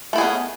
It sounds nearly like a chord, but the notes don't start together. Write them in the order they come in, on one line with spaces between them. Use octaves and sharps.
A3 E4 G#4 B3 C#4